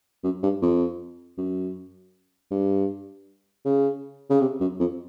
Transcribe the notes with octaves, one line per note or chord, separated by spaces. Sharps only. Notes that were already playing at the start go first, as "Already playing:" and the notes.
F#2
G2
F2
F#2
G2
C#3
C#3
C3
F#2
F2